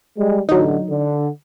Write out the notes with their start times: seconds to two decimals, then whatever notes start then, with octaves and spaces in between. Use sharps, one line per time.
0.17 G3 G#3
0.49 A1 D3 F#3 D#4
0.89 D3